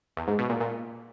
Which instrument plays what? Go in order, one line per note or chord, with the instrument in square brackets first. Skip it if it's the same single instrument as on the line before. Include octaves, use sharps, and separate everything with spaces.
[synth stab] E2
G#2
B2
A#2
A#2